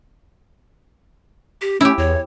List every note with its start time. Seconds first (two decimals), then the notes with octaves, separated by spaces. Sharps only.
1.61 G4
1.81 A3 C#4 E4 G4
1.98 E2 C#5